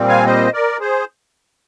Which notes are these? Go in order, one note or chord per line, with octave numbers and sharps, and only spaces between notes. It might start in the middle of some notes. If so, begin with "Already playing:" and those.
Already playing: A#2 G3 C4
F5 G#5
C5 D#5
A#4 D5
G#4 C5